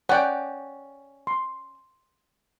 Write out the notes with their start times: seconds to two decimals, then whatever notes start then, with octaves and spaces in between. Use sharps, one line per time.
0.09 C#4 D5 F#5 G5
1.27 C6